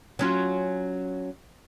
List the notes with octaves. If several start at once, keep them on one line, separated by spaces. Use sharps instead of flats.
F#3 C#4 F4